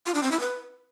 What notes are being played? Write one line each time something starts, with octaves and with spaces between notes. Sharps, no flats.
F4
D4
C4
E4
B4